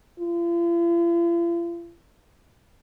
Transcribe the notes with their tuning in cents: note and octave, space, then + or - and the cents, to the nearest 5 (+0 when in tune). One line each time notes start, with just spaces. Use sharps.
F4 -45